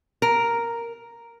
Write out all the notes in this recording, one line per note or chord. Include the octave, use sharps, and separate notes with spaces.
A#4